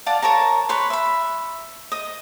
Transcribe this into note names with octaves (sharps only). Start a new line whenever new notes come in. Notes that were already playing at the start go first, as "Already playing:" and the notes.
D5 F5 F#5 A5
A#4 C#5 A5 A#5
B4 C#5 C6
E5 B5
D#5